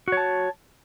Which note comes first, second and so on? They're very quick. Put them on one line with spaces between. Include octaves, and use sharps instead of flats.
F#4 C#5 A5